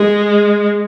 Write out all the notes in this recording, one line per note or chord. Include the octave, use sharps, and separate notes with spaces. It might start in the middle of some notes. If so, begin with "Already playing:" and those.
Already playing: G#3